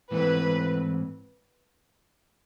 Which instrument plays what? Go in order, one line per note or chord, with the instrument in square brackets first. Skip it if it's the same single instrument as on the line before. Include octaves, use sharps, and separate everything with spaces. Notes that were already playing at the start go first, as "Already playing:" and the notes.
[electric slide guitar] G#2 E3 A3 C4 E4 [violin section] B4